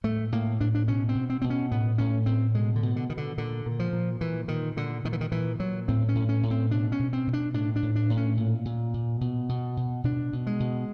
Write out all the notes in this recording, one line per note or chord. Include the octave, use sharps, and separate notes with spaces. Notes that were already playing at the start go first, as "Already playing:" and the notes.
A2 A3
A2 A#3
A2 D4
D4
B2 C#4
C4
B2
C4
B2 C4
C#4
A2 B3
A2 C#4
A2 C4
B2 G#3
D3
B2
D3
B2 D#3
D3
A#2 D3
A#2
F3
A#2
A#2 E3
A#2 D#3
A#2 D3
A#2 D#3
E3
D#3
A#2 E3
A#2 F#3
A2 C4
C#4
A2
C#4
A2
C4
B2 D4
C#4
B2
C4
B2
D4
A2 D4
D4
A2
D4
A2
C#4
A#2
A#2
A#2
B2
B2
B2
B2 D4
B2
G#3
B2